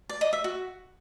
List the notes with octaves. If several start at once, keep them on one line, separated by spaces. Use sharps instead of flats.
D5
D#5
E5
F#4